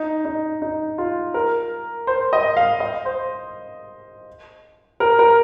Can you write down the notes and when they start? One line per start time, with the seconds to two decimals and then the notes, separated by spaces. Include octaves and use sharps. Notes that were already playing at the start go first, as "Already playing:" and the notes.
Already playing: D#4
0.25 D#4
0.62 D#4
0.98 F4
1.34 A#4
2.07 C5
2.33 D#5
2.57 F5
2.80 D#5
3.05 C5
5.00 A#4
5.19 A#4